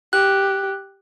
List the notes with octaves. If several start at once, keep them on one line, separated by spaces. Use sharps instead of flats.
G4 F#6